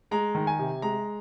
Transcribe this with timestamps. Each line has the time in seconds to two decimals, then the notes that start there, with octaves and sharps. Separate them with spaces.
0.11 G#3 A#5
0.35 D#3
0.47 G#5
0.59 C3
0.82 G#3 A#5